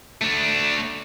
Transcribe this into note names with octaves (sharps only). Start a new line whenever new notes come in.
A3 D4